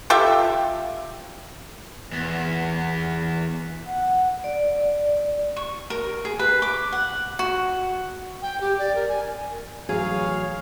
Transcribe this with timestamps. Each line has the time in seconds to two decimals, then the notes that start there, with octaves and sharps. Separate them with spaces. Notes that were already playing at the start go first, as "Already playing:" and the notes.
0.10 F4 G4 A4 E5
2.12 E2 B3
3.87 F#5
4.44 D5
5.56 C#6
5.90 A#4
6.25 G#4
6.39 B4
6.62 D6
6.92 F#5
7.39 F#4
8.42 G5
8.61 G4
8.79 D5
8.95 A#4
9.08 G#5
9.89 A1 F#3 G#4 C#5 F5